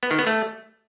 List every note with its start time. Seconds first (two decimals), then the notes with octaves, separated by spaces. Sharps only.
0.03 B3
0.11 D#3
0.19 B3
0.27 A3